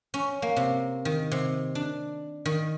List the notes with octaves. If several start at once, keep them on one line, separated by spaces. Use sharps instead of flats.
C#4
A#3
C3
D#3
C3
D4
D#3